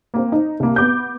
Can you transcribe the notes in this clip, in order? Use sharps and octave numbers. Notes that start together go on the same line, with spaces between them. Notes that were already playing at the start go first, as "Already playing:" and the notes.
A#3 C4
D#4
C2 A#3
B3 D6 G6